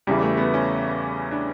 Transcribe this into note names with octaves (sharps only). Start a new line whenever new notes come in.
E2 C#3 E3 G3
A3
B3
C#4
D4